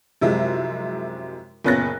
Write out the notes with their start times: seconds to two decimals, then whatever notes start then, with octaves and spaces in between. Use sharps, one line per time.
0.21 F#2 C3 F3 G#3 E4
1.64 F#1 A#2 B3 C#4 F#6 A#6